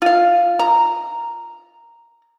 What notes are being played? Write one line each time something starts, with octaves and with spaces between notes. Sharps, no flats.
F4 F5
A#5